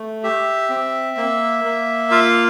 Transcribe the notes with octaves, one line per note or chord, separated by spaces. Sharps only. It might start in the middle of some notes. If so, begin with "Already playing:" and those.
Already playing: A3
G4 E5
C4
A#3
A#3
F4 F5